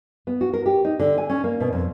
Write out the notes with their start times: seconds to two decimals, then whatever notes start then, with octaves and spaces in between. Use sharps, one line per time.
0.27 B3
0.41 F#4
0.53 A#4
0.66 G4
0.85 D#4
1.00 D3
1.18 G#5
1.29 C#4
1.44 A#3
1.60 B2
1.73 F2